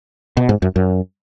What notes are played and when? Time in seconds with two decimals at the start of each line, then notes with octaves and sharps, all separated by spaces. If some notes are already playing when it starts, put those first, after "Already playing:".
0.37 B2
0.49 G#2
0.62 F#2
0.76 F#2